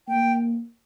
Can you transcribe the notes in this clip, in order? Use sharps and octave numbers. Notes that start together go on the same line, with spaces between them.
A#3 G5